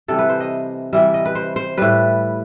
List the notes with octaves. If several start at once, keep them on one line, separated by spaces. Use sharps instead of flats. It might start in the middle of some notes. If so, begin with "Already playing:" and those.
C3 E3 G3 A4
B4
C5
D#5
C3 E3 G3 E5
D#5
B4
C5
C5
A2 G3 B4